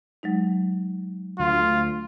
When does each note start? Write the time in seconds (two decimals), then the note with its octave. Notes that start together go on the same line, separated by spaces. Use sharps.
0.23 F#3 G#3 D#4
1.39 D2 F4